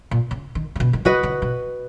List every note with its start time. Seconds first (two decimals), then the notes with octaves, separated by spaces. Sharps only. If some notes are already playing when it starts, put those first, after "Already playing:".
0.11 A#2
0.31 C#3
0.55 D#3
0.76 C#3
0.80 B2
0.93 D#3
1.05 C#3 F#4 B4 D#5
1.23 C#3
1.42 B2